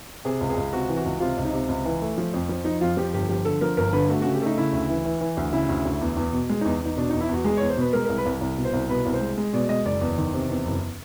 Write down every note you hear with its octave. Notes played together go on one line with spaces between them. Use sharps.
C3 G#4
C#2
G#4
C#2
C3 F#4
E3
F#4
C#2
C3 F4
C#2
D#4
C3
C#2
E3
A3
F3
F2
F3
F3 D#4
F2 F4
F3 G4
G1 G4
F3 G4
D3 A4
F3 A#4
G1 A#4
D3 B4
A3 F#4
C#3 F#4
G4
A3 D#4
C#3 E4
D2
E3
E3
E3
D2
C#3 E4
D2
D2
E2
E2
B2
G#3
D#4
E2
E2 D#4
B2 D4
E2 D#4
E4
E2 F#4
G#3 G#4
C#5
E2
C5
B2 B4
G#3 A#4
A#4
C2
B4
C2
C2
B2
C5
C2
B2 B4
C2
C5
G#3
G#3
B2 D5
G#3 D#5
F#1 D5
E2
D#3
C3
E2
F#1